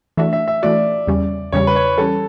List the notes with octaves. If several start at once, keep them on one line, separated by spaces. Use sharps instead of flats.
E3 A3 D4 F#4 E5
E5
E5
E3 A3 D4 F#4 D5
E2 C#3 G3 C#4
E2 C#3 G3 C#4 C#5
B4
C#5
E3 G3 C#4 A4